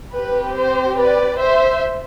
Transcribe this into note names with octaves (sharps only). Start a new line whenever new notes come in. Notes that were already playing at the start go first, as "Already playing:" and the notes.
C4 G4 B4
C5
B4 D5
C5 E5